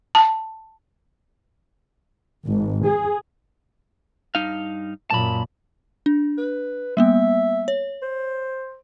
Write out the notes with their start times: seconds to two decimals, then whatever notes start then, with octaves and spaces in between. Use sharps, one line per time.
0.15 A5
2.47 G#1
2.85 G#4
4.35 G2 D#4 F5
5.10 F#2 A#2 A5 B5
6.06 D4
6.38 B4
6.97 G3 A#3 B3 E5
7.68 C#5
8.02 C5